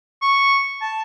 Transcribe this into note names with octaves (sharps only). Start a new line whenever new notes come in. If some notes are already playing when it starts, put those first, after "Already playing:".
C#6
A5